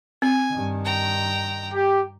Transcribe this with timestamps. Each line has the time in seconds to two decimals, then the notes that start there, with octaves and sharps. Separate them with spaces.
0.22 C4 G#5
0.52 G2 D#3
0.85 G5 A#5
1.72 G4